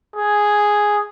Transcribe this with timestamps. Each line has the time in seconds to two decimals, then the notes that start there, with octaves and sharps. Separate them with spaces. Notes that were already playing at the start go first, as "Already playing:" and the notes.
0.15 G#4